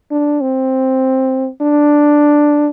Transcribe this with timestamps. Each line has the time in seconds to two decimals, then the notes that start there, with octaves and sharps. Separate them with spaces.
0.11 D4
0.41 C4
1.61 D4